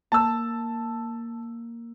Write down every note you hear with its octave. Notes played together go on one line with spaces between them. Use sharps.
A#3 A5 E6